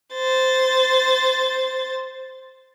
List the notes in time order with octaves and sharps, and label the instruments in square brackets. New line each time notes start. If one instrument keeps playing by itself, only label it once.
[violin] C5 A6